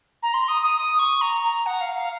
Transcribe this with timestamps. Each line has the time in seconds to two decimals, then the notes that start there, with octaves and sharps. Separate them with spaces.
0.23 A#5
0.34 C6
0.48 D#6
0.62 D#6
0.77 D#6
0.99 C#6
1.21 A#5
1.43 A#5
1.66 F#5
1.81 F5
1.95 F5